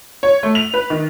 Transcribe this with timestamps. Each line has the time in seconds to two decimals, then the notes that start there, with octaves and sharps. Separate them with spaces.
0.23 C#5
0.43 A3
0.55 F7
0.74 B4
0.90 D#3